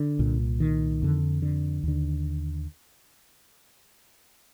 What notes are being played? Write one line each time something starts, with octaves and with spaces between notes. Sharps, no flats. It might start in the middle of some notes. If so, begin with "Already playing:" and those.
Already playing: D3
C2 A#2
D#3
F2 D3
D3
D#2 D3